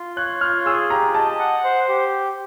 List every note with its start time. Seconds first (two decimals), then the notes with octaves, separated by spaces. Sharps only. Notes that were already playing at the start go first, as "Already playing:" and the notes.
Already playing: F4
0.17 C#5 F#6
0.41 F4 F6
0.65 G#4 E6
0.90 G4 A#5
1.14 D#5 A5
1.39 F#5
1.64 C5
1.89 G4